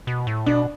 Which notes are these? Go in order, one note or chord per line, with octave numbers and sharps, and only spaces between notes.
B2
A2
B2 D4